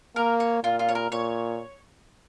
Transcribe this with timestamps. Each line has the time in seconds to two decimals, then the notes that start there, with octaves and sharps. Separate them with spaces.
0.16 A#3 A#4
0.40 C#5
0.63 A#2 F4
0.79 F4
0.89 C#5
0.95 A#4
1.11 A#2 C#5